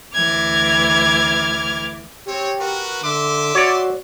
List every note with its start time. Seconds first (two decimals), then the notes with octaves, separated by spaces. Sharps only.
0.15 D2 E3 D6 F6 G#6
2.27 C4 G4 C#5
2.59 F#4 A#4 B4
3.03 D3 E5 C6 D6
3.55 F#4 C#5 D5